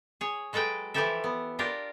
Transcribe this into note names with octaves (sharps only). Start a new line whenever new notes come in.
G#4 C#5
F#3 G#3 A4 B4 G5
E3 F3 E4 G4 A4 E5
B3
D4 F4 G4 A#4